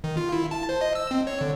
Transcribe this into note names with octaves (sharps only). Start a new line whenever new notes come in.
D#3
F4
E4
A5
C5
D#5
E6
C4
C#5
D3